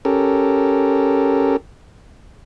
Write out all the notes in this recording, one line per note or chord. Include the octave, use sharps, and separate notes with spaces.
C#4 G4 A4 A#4